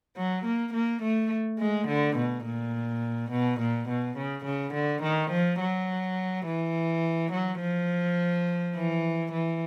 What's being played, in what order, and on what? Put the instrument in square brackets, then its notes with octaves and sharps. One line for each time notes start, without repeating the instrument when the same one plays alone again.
[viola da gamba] F#3
A#3
A#3
A3
G#3
D3
B2
A#2
B2
A#2
B2
C#3
C#3
D3
D#3
F3
F#3
E3
F#3
F3
E3
E3